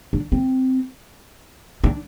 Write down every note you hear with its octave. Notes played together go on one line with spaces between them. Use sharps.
D4
C4
D4